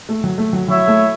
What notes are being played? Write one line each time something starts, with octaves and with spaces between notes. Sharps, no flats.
A3
F#3
A3
F#3
F#3 E4 C#5 E5
A3